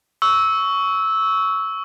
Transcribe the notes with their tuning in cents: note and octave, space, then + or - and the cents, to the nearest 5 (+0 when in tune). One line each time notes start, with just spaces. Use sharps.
C#6 +15 E6 -10